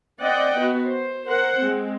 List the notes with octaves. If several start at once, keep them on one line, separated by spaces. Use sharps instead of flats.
C4 D5 D#5 F#5 G5
B3 F#4
C5
A#4 C5 F#5
G#3 C4